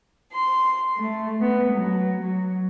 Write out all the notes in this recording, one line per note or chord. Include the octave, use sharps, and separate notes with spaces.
C6
A3
B3
F#3
F#3